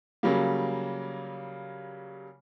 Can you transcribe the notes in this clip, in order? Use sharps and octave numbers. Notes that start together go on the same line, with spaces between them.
C#3 F#3 G3 A#3